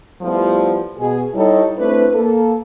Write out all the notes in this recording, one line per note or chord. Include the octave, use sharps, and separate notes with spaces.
F3 G3 A3 B3 E4 F4
B2 G#4
G3 D#4 E4 A4 C#5
A3 C4 D4 E4 B4
A#3 A4